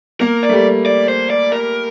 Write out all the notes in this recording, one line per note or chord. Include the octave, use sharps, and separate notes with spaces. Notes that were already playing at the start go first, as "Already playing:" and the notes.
A#3 A#4
D5
A3
G3
D5
C5
D5
A#4